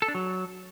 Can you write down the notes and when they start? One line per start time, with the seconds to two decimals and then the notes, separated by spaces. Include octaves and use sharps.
0.02 A4
0.08 D4
0.15 F#3